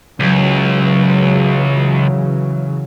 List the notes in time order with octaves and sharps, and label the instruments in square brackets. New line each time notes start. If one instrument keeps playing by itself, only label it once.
[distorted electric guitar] C#2 [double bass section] C#3 E3 F#3